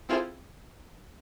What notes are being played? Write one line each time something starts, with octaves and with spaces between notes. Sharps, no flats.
C4 E4 F4 G#4 A4 C5